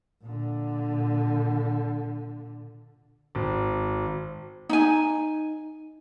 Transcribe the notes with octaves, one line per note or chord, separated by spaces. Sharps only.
A#2 D3
G#1
D#4 G#5